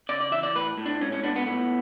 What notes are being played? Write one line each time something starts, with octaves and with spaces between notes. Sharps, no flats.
C#3 D5
D5
E3 E5
D5
A2 B4
A2
D4
G#2 C#4
C#4
B3 D4
B3
A2 B3